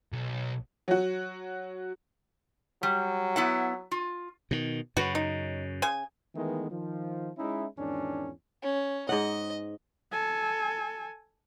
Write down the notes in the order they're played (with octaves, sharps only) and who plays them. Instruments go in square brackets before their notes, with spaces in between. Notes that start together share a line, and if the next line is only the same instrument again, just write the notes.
[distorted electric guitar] B1
[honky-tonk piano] F#3 F#4
[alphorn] F#3 [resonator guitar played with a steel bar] G3
[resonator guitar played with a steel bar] B3 E4 F#5
F4
[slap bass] B2 D#3
[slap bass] F#2 C#3 [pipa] F#4 B4
[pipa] D#4
C#3 G#5
[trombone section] D#3 E3 G#3 A3 B3
D#3 F3
G#3 C#4 D#4 E4
E2 G#2 D#3 C#4 D4
[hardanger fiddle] C#4
[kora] G#2 F#5 [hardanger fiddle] D#5
[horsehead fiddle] A4 G#5